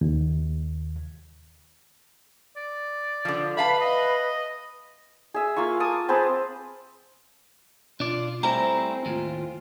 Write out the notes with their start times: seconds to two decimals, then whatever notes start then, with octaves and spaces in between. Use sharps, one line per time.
0.01 D#2
2.56 D5
3.25 D3 F3
3.57 B4 E5 F5 A5 B5
3.81 D#5
5.34 G#4 E5
5.56 A#3 F4 F5 C#6
5.80 A5 D6 D#6
6.09 C4 G#4 B4 A5
8.00 B2 D4 F4 D5
8.43 G3 A3 C4 E4 C5 G5 G#5 A#5
9.06 D#2 A2 F4